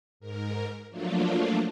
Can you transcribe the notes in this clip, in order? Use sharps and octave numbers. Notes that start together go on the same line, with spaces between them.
G#2 A#4
F3 F#3 A3 A#3 D4 F4